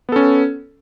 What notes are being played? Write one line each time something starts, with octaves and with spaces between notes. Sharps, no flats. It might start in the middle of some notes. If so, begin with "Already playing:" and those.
B3 C#4 A4